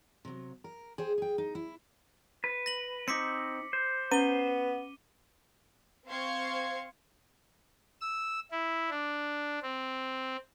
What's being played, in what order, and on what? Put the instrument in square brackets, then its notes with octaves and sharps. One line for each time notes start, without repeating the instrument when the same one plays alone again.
[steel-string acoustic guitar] C3 F#3
A#4
G#4 C5 G5
G#4 G5
D#4
E4
[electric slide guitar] B4
[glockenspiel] A#6 F#7
[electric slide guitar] C4 D#4 [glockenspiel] D6 B6 C#7
[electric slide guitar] C5
[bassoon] B3 [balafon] C#4 [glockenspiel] D#7 G7
[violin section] C4 C5 F5 C6 C#6 G#6
[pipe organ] E6
E4
D4
C4